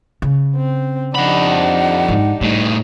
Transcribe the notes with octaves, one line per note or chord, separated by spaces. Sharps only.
C#3
C4
F2 D4 D#4 G4 F#5 B5
G#2
A2 G3 D#4